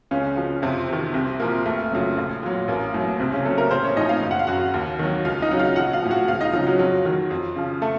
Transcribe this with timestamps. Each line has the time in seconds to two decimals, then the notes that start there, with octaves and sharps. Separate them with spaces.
0.11 C#2 C#3 C#4
0.37 C#3 F3
0.62 F2 C3 C4
0.88 C3 D#3
1.14 C2 C3 C4
1.40 A#2 F3 A#3
1.66 F1 A3
1.92 F2 C#3 F#3
2.17 A#1
2.43 A#2 F#3
2.68 A1 A#3
2.94 A2 F#3
3.19 C2 C3 C4
3.32 C#3 C#4
3.45 C3 F#3 A3 A4
3.58 A#3 A#4
3.71 A1 C4 C5
3.84 C#4 C#5
3.96 A2 F3 D#4 D#5
4.09 F4 F5
4.23 F#1
4.31 F#5
4.39 F5
4.47 F#2 C#3 F#4 F#5
4.74 D#2
4.99 D#3 F#3
5.25 C#2 F4 F5
5.42 D#4 D#5
5.51 C#3 F#3
5.59 F4 F5
5.76 A#1 F#4 F#5
5.93 F4 F5
6.02 A2 F3
6.11 F#4 F#5
6.28 C#2 F4 F5
6.41 D#4 D#5
6.53 C#3 F3 F#3 F4
6.66 F#3 F#4
6.79 F2 F#3 F#4
7.05 D#3 F#3
7.30 F2
7.56 C#3 F3
7.82 A3 A4